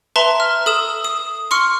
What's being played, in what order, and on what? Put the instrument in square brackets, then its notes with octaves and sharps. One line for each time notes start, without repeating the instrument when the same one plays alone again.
[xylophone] B4 E5 A5 A#5 C6
F6
A4 D#6 E7
D#6
C6 C#6 F6 C#7